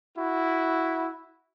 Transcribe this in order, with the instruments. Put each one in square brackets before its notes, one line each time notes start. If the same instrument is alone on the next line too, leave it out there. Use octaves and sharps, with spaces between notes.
[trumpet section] E4 F#4